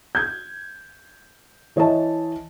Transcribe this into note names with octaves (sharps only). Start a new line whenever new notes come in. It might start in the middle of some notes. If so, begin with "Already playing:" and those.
G6 G#6
E3 C#5 D#5 E5 A5